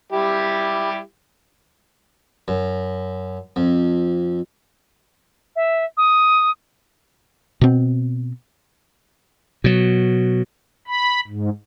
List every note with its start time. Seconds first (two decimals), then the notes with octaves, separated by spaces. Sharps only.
0.12 G3 E4 G4
2.48 F#2
3.56 F2
5.56 E5
5.97 D#6
7.61 B2 C4
9.64 B2 F#3
10.87 B5
11.28 G#2